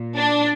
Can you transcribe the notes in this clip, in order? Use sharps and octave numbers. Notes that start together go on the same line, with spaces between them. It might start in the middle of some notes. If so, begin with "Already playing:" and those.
Already playing: A#2
D4